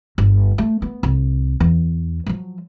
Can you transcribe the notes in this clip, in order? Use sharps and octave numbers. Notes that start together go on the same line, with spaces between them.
G1
A3
B3
C2
E2
F3 F#3